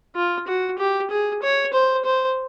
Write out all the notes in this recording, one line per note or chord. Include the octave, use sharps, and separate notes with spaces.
F4
F#4
G4
G#4
C#5
C5
C5